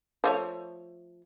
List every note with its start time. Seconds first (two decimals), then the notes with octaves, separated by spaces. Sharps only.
0.24 F3 A3 C#5